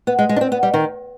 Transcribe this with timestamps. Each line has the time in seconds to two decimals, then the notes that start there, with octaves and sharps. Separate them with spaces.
0.07 B3
0.19 G#3
0.29 G#3
0.36 D4
0.41 C4
0.52 B3
0.63 G3
0.74 D#3